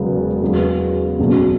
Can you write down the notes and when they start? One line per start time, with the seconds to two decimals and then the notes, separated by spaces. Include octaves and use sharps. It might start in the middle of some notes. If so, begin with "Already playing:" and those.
Already playing: E1 E2 C#3 F#3 B3
0.42 E2 C#3 F#3 B3
1.19 F#1 E2 B2 F#3 C#4